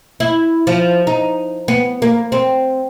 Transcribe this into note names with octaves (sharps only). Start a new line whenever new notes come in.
E4
F3
D#4
B3
A#3
C4